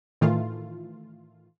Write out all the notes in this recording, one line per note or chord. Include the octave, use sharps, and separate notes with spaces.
A2 D#3 E3 A3 F4